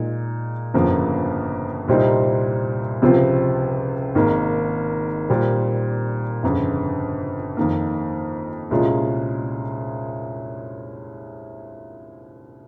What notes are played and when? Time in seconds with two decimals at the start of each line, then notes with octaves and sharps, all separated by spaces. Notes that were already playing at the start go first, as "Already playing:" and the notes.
Already playing: A#2 G#3 D#4
0.74 G1 F2 C#3 F3 A#3
1.88 C2 A#2 G3 C4 D#4
3.02 C#2 C3 F3 C4 F4
4.15 G#1 G#2 D#3 A#3
5.30 A#2 G3 C4
6.43 G1 F2 C#3
7.57 F2 D#3 A#3
8.71 C2 A#2 G#3 C#4 F4